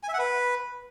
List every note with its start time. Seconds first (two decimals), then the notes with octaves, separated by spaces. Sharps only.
0.03 G#5
0.08 E5
0.14 F#5
0.19 B4